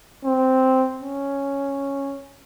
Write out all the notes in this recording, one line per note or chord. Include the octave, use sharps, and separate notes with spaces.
C4
C#4